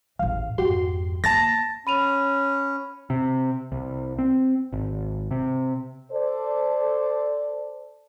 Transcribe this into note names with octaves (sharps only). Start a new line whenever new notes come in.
A1 E2 F5
G#1 F2 F#4 G4 C6
A#3 A5 A6 A#6
C#4 B5 D#7 F7
C3
C2
C4
G#1
C3
A4 C5 D5